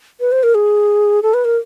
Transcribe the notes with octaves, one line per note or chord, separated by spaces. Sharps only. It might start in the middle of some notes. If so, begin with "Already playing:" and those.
B4
C5
A#4
G#4
A4
B4
A#4